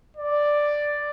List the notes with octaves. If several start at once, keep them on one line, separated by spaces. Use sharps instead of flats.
D5